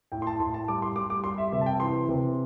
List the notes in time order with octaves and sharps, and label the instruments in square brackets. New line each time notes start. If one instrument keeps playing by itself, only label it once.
[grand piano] A2 G5
C6
A5
A2 C6
A5
G3 D6
C6
G3 D6
D6
G3 C6
E5
C3 E5
A5
G5
E3 C6
C3